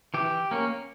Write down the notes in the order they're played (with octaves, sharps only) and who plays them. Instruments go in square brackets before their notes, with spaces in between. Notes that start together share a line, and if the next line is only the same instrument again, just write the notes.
[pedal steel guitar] E3 G4
A#3 C#4